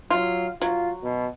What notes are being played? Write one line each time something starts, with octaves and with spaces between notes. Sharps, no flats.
F#3 F4
F#3 F4
B2